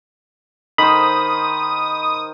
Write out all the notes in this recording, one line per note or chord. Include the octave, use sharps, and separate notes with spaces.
D#3 C5 B5 D#6